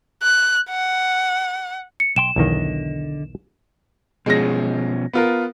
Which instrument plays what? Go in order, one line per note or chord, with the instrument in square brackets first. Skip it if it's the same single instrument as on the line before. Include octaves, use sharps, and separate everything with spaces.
[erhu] F#6
F#5
[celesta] C#7
[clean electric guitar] B1 G5 C6 [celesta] E7
[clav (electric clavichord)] B1 E2 D#3 [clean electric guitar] D3 D#5
[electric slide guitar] B2 F3 C#4 [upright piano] G#3 A#6
[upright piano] B3 F4 A#4